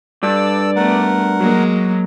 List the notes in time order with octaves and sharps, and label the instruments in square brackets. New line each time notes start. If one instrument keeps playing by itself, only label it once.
[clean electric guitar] G2 [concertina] A4 E6 [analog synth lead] D5
[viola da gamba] A3 B3 [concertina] A#4 F#5
[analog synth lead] F#3 [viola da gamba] G#3 A#3